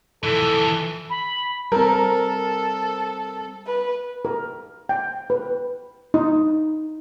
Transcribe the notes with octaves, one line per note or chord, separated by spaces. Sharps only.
E3 F3 A4
B5
G3 C4 A4 A#4
B4
A#4
G5
B4
D#4